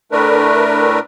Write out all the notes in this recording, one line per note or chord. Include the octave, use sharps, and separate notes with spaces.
A2 A3 D4 A#4 B4